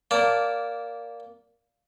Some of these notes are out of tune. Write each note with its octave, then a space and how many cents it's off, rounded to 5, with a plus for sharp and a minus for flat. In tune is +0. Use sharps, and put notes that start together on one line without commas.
A#3 +0 D5 -20 A5 +0